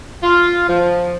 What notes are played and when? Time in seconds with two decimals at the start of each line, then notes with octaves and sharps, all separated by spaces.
0.23 F4
0.69 F3